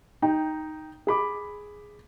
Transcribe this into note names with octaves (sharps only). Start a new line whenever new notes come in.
D#4 G5
G#4 B5 D6